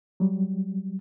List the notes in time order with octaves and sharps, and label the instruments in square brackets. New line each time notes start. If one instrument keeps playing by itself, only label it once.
[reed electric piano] F#3 G3